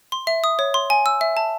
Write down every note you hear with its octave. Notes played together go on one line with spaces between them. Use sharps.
C6
E5
D#6
C#5
C6
G#5
E6
E5
A5